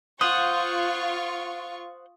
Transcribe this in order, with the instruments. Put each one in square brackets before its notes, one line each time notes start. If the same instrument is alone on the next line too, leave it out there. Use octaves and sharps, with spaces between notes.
[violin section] F4 C#6 [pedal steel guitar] C5 F#5 [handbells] D#6